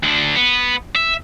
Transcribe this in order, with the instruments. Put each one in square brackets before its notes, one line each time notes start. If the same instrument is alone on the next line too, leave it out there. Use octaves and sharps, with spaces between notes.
[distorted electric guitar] D2 D3
B3
E5